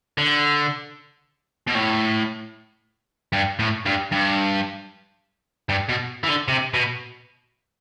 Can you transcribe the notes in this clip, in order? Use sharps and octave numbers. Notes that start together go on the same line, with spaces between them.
D3
B2
A2
G2
A2
G2
G2
G2
B2
E3
D3
C3
B2